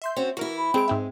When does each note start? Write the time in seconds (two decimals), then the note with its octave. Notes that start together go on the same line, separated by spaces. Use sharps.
0.02 E5 C6 G6
0.16 C4 C#4 F#4
0.37 E3 E4 F#4 A#4
0.57 B5
0.74 G#3 C4 G#4 D7
0.88 G#2 C4 E5